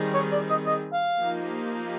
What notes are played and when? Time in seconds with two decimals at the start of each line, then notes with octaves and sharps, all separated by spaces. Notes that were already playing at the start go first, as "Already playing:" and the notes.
Already playing: D#3 G3 C4 D#4 G#4
0.14 C#5
0.32 D5
0.50 D#5
0.66 D#5
0.93 F5
1.19 F3 A#3 D#4 G4